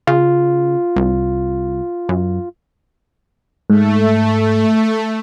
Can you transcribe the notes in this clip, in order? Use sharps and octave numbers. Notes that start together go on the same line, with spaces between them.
C#3 F4
C2
F#2
G#2 A3